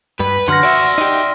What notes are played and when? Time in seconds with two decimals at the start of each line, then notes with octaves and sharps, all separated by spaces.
0.20 G2 B4
0.48 F#2 D3 F#3 F#5 C6 F6 A#6
0.63 F#4 D5 E5
0.98 D#4 G4